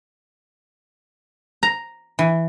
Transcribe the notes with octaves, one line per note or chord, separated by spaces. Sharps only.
A#5
E3